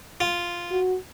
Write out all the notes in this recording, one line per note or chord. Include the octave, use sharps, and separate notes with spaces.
F4
F#4